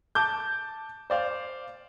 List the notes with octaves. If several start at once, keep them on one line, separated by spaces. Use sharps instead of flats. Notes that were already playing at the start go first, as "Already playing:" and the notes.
A5 D6 G6
C5 D5 F5